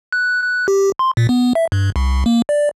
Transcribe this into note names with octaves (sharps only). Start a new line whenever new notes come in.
F#6
F#6
G4
C6
A#2
B3
E5
G2
C2
A#3
D5